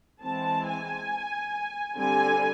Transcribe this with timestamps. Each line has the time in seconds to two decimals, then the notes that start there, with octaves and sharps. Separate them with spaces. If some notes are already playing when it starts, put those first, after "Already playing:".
0.22 E3 G#3 C4 A5
0.66 G#5
1.97 D3 G3 C4 G#5